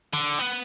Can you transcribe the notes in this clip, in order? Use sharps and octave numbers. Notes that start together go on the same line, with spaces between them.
D3
B3